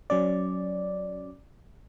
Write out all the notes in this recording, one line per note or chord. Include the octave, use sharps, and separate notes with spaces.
F#3 C#4 D5